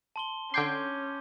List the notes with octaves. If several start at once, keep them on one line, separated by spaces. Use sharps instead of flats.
A5 C6 G7
D3 C#4 G5 C6 D6 G6 G#6